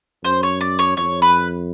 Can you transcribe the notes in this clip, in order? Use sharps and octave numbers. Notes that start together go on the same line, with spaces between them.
F#2 C5
C#5
D5
C#5
F2 C#5
B4